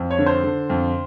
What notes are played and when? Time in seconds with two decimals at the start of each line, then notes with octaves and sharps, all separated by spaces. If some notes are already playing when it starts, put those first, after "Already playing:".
Already playing: F2
0.11 C#5
0.18 D3
0.26 C5
0.44 D3
0.70 F2